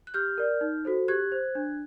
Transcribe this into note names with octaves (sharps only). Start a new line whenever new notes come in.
F#6
G4 F6 G6
A#4 D5
D#4
F#4 A4 C5
G4 F#6 G#6
C5
D4